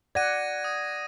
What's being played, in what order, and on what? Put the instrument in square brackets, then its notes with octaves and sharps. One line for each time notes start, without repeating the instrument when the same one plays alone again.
[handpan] D5 F#5 [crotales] G#6 A#6 D#7
[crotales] D#6